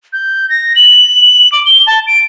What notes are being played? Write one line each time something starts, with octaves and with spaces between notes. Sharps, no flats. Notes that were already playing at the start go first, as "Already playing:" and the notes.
G6
A#6
F#7
D6
G7
A5
D7